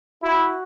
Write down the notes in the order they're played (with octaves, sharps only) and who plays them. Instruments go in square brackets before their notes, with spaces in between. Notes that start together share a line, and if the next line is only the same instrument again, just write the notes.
[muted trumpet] E4 [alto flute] F#4